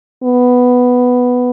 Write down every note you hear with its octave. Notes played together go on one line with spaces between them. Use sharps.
B3